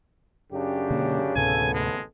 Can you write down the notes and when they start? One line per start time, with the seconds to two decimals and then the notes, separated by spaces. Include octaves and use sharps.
0.52 F#2 C#3 D4 G4
0.90 B2 D3 A#3
1.36 A1 D2 A2 C3 B3 A4 G#5
1.74 G#3